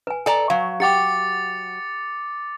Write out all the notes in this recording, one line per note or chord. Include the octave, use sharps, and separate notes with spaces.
B4 G#5
A4 D5 G#5 A#5
F#3 F5 C#6
G4 F#5 G5 D6 A6 C#7